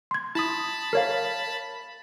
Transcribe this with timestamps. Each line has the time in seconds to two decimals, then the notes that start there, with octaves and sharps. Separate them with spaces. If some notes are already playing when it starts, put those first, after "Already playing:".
0.11 C6 G#6
0.35 E4 A5 B5 D#6
0.93 A#4 C#5 F5